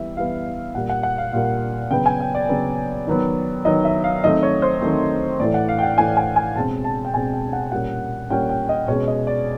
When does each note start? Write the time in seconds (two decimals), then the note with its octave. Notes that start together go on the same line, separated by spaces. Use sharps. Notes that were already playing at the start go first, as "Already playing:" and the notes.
Already playing: E3 G3 B3 E5
0.17 E3 G3 B3 F5
0.74 A#2 G3 A#3 F#5
0.89 F#5
1.03 F#5
1.18 F5
1.33 A#2 G3 A#3 F5
1.91 C#3 F#3 B3 G5
2.06 G#5
2.20 G5
2.35 D5
2.49 C#3 F#3 B3
3.07 D#3 F#3 B3
3.65 D#3 F#3 B3 D#5
3.85 E5
4.04 F5
4.24 D#3 F#3 A3 C4 D#5
4.43 C#5
4.62 C5
4.81 D#3 F#3 A3 C4
5.40 A2 E3 A3 D5
5.54 F#5
5.69 F5
5.79 G5
5.83 F#5
5.98 A2 E3 A3 G#5
6.17 G#5
6.36 G#5
6.56 B2 G#3 C4 A5
6.84 A5
7.05 G5
7.14 B2 G#3 C4 G#5
7.33 G5
7.53 F#5
7.72 A#2 G3 A#3 C#4 F#5
8.30 A#2 G3 A#3 C#4 G5
8.49 G5
8.69 D#5
8.88 B2 G#3 C#4 C#5
9.08 D#5
9.27 D5